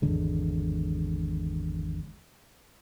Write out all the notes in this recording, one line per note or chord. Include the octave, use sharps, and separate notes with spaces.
G#1 E2 D3 G#3